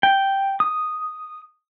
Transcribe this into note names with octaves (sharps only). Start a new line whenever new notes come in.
G5
D#6